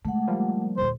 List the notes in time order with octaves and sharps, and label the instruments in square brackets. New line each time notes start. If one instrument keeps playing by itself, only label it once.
[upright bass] C#3 G#3 [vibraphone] A3 F#5
[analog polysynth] F3 G3 A#3
[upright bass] D#1 D3 [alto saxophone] C5